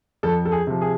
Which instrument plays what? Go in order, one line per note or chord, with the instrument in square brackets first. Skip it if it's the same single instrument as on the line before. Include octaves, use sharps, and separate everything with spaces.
[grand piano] F2 A4
A4
G#4
C3 F3
G#4